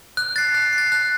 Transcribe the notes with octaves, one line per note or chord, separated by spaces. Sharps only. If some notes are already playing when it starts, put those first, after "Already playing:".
F#6
A6 C7
F#6
C7
A6
F#6